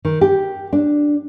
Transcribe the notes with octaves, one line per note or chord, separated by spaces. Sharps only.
D#3
G4
D4